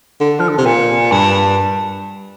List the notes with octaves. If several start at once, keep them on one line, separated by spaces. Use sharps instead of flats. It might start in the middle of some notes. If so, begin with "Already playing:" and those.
D3
F3
D3
C3
A#2
G2